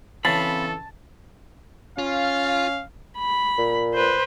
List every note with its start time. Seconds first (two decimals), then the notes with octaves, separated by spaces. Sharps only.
0.25 C#3 E3 C4 A4 F5 A5 B5
1.98 C#4 F4 F5
3.18 B5
3.58 A#2
3.94 B4 C5